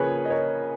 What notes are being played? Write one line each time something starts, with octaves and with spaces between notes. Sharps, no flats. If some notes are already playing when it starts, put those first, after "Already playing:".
Already playing: C#3 F3 A#3 G#4 B4 C#5
D#5
A#4 C#5